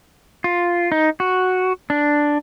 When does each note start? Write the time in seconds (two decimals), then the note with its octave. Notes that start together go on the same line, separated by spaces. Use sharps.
0.44 F4
0.92 D#4
1.20 F#4
1.90 D4